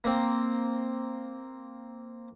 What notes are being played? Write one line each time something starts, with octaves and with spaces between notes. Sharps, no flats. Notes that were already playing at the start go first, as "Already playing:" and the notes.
A#3 C4